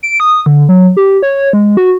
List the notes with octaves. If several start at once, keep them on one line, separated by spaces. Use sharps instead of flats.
D7
D#6
D3
F#3
G4
C#5
G#3
F#4